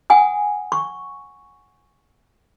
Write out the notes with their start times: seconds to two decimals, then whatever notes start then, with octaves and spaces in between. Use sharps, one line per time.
0.10 F#5 G#5 D#6
0.72 C#6